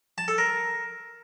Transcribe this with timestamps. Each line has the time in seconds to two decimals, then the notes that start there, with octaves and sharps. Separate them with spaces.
0.18 A5
0.28 A4
0.38 A#4